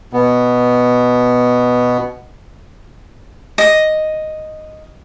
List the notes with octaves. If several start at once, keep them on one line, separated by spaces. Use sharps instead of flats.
B2 B3
D#5